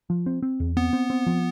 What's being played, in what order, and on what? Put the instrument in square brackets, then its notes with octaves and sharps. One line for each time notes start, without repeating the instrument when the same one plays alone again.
[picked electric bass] F3
C4
C4
E2
[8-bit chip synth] B3 [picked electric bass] C4
[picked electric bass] C4
C4
F3